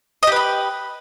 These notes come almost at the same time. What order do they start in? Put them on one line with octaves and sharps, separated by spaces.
D#5 G4 B4 B5